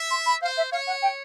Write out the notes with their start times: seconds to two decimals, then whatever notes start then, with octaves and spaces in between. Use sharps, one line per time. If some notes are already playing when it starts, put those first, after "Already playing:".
Already playing: E5
0.11 C6
0.26 B5
0.42 C5 F5
0.57 E5
0.72 C#5 F5
0.87 F#5
1.02 G5